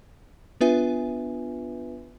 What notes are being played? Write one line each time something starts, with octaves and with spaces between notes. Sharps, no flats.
B3 D4 F4 B4 E5 G#5